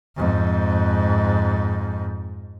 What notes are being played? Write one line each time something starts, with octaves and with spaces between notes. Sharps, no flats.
F2 G#2